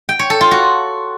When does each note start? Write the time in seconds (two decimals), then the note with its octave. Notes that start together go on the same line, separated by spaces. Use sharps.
0.09 G5
0.19 C#5
0.30 A4
0.41 F4
0.51 F#4